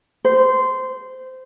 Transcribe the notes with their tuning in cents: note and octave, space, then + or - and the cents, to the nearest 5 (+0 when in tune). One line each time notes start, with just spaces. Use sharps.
C5 -15